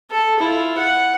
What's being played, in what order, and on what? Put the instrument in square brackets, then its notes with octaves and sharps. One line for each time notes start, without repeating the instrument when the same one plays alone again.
[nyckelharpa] A4
E4 F4
F#5